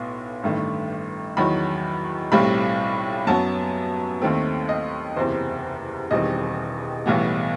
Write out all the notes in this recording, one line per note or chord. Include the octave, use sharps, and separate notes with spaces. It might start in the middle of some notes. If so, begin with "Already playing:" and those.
Already playing: B1 A2 B3 C6
A1 G2 D#3 A3
E2 D#3 F#3 B5
B1 A2 G3 C4 B5
F#2 F#3 B3 A5
D#2 D#3 A3 C4
D#5
F#1 E2 C3 C5
E1 E2 D#3 G3 C4 D#5
B1 A2 E3 G3 B3